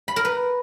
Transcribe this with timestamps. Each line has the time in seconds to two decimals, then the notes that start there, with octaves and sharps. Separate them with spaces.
0.08 B5
0.16 A#4
0.25 B4